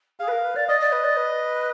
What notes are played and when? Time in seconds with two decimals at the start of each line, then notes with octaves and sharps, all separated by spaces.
0.20 G#4 F5
0.28 B4
0.31 A#4
0.44 B4
0.56 D5 F5
0.68 D5 D#5
0.80 D5
0.92 B4
1.04 D5
1.17 B4